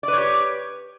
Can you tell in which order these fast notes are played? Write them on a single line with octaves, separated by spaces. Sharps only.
D5 B4 C#5 G4